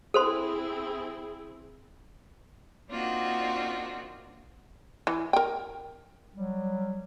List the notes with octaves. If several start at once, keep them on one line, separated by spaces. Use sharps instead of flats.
C4 E4 G#4 A4 C5 C6
A#3 C4 D4 D#4 F4 F#4
E3
A#4 G5
F#3 G3